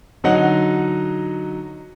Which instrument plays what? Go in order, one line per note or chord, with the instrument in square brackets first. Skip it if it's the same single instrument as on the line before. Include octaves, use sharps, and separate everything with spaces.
[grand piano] D3 F#3 D#4 D#5 F#5